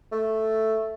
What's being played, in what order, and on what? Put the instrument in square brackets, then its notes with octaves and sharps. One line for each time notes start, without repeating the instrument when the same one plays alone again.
[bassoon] A3